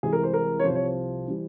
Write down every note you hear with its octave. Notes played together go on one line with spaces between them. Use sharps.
C2 C3 E3 G#3 G#4
A#4
C5
A#4
C#5
C2 C3 F3 C5
C#5
C5
E3 G3